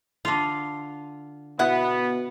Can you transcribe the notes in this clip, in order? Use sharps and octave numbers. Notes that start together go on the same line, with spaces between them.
D3 F4
B2 B3 E4 F#5